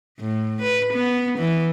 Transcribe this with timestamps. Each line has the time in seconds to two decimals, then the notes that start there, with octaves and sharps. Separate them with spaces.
0.20 A2
0.62 B4
0.94 B3
1.39 E3